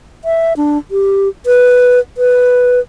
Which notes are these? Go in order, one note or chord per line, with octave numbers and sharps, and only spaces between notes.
E5
D4
G4
B4
B4